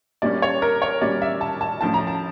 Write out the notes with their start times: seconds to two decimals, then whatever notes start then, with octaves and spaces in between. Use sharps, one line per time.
0.22 A#2 G3 A#3 C#4 D5
0.42 C#5
0.62 A#4
0.82 C#5
1.01 A#2 G3 A#3 C#4 D5
1.22 E5
1.41 A5
1.61 A5
1.81 A2 F3 C#4 A5
1.94 A#5
2.07 A5